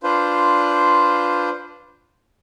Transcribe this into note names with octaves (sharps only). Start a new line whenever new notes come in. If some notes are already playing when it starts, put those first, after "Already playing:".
D4 F4 B4 C5